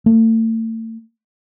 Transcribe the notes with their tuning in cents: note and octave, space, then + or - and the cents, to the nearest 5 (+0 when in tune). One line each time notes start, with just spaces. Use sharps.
A3 +40